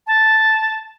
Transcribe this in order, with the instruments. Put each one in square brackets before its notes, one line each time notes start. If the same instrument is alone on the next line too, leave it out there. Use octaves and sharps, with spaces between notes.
[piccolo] A5